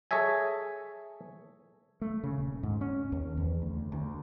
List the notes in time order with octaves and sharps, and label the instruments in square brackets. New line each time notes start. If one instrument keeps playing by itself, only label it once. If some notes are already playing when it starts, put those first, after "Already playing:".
[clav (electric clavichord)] G#4 A4 C#5 D#5 E5 G#5
[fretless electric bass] A3
C#3
D#1
G#2
C#4
D#2
E2
D2
D2